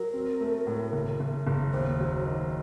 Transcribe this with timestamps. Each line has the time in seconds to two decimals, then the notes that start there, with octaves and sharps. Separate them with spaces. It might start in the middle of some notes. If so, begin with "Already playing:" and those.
Already playing: F#3 A#4
0.13 C4
0.41 A3
0.67 A2
0.93 F#1
1.20 F#1
1.47 F#1
1.73 D#2 C5
2.00 F#3
2.26 D#3